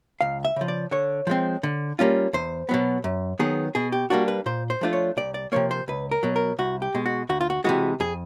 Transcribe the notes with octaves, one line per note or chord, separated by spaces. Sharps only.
C#2 F5
E5
C#3 F3
D5
D3 C#5
F3 G#3 C4
D3
G3 A#3 C#4 F4
E2 C5
B2 F#3 B3
F#2
D#3 F#3 B3 G#4
B2 G#4
G4
G3 A#3 D4 F#4
B4
A#2 C5
C5
F3 A3 D4 F4
C#5
C2 D5
D5
C3 F3 A#3 C#5
C5
C#2 B4
A#4
B2 F#3
A#4
C2 F#4
G4
B2 G#3
F#4
D2 F#4
F4
F#4
C3 E3 G#3 F#4
F2 G#4